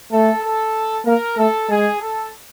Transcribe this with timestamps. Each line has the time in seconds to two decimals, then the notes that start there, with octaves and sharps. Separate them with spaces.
0.11 A3 A4
0.43 A4
1.06 A#3 A#4
1.37 A3 A4
1.69 G#3 G#4
2.01 A4